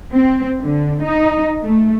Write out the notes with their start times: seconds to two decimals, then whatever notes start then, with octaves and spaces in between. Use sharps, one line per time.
0.13 C4
0.62 D3
1.03 D#4
1.63 A3